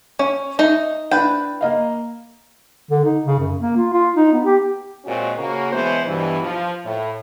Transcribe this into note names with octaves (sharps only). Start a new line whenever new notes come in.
C#4 C#5
D#4 D#5 E5
D4 E4 B4 G5
A#3 D#5 F5
D3
D#4
C#3
F#2
A#3
F4
F4
D#4
B3
G4
A#2 G#3 C4 C#4 F#4
C#3 A#3 F#4
B2 E3 F#3 G#3 B3 C5
G2 B2 E3
F3
A2